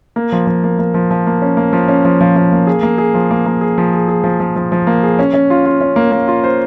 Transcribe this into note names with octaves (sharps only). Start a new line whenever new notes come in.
A#3
F3
F3
A#3
A#3
F3
F3
A#3
C#4
A#3
F3
C#4
F3
F3
F3
A#3
G#4
A#3
G#4
F3
A#3
A#3
G#4
F3
G#4
G#4
F3
F3
F3
F3
A#3
G#4
C#4
C#4
F4
F4
C#4
A#3
A#3
F4
C5